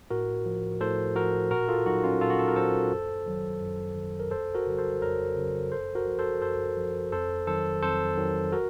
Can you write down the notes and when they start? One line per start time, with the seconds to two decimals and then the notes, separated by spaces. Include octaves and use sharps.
0.10 A2 F#4 A#4
0.45 F3
0.81 A2 A4 C5
1.16 F3 F#4 A#4
1.51 A#2 F#4 A#4
1.68 F4 A4
1.86 F#3 D#4 F#4
2.04 C#4 F4
2.21 A#2 F4 A4
2.30 F#4
2.39 A4
2.48 A#4
2.56 F#3 A4 C5
2.91 F#2
3.26 D#3 F#3
3.61 F#2
3.96 D#3 F#3
4.20 A#4
4.31 F2 A4 C5
4.54 F#4 A#4
4.66 C#3 F#3
4.78 A4 C5
5.02 F2 A#4 C#5
5.37 C#3 F#3
5.72 F#2 A4 C5
5.95 F#4 A#4
6.07 F3
6.19 A4 C5
6.42 F#2 A4 C5
6.77 F3
7.12 F2 A4 C5
7.47 D#3 F#3 A4 C5
7.82 F2 A4 C5
8.17 D#3 F#3
8.52 F#4 A#4